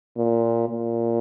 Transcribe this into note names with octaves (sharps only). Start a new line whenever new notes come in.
A#2
A#2